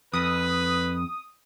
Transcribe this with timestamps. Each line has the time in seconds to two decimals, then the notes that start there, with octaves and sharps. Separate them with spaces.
0.13 F2 B4 D#6